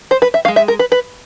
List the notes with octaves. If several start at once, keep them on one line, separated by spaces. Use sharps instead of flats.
C5
B4
E5
C#4 F5
G#3
E5
A#4
B4
B4